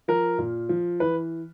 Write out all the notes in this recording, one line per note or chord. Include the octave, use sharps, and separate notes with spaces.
F3 A#4
A#2
F3
E3 B4